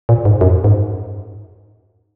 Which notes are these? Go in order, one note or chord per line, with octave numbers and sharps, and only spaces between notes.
A#2
G#2
F#2
G#2